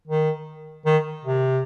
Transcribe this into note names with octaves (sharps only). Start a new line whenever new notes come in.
D#3
D#3
C3